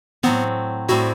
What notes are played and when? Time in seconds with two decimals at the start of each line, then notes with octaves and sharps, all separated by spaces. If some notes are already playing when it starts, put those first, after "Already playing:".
0.23 A2 F#3 B3 C4
0.88 A2 G3 C4 E4 F#4